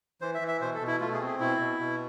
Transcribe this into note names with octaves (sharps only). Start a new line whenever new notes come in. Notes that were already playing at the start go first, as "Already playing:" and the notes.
E3 C5
E5
E3
E5
B2 C5
A4
B2
E4
A3 F4
G#4
C4
G#4
B2 E4
B2
B2